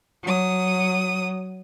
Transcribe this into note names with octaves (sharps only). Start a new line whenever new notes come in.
F#3 D#6